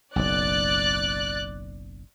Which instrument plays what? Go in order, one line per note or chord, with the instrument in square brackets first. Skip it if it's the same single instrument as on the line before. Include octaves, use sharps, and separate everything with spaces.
[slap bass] F#1 B1 [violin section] D5 F#6 A6